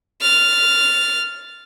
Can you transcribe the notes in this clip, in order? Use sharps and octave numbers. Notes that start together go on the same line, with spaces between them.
F6 A6